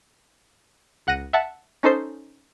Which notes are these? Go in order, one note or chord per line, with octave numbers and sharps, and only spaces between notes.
C#2 F#5 F#6 A#6 D#7
E5 F#5 A5
C#4 D#4 A4 C5 C7